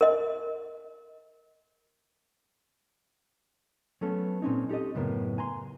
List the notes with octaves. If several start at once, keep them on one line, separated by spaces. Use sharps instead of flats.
A#4 D#5
F#3 A3 B3 C#4 A4
A#2 C4 C#4 D#4
D#4 G4 A4 D#5
F#2 A2 C#3 B3 A#4
G#5 A#5 C6